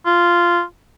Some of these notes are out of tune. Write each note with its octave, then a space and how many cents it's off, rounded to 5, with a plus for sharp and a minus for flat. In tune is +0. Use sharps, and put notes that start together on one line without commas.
F4 -10